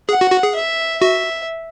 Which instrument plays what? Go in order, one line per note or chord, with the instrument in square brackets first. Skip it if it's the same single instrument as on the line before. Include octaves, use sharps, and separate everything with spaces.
[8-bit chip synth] G#4 [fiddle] F#5
[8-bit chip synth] F#4
F#4
G#4
[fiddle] E5
[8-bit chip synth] F#4 [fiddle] E5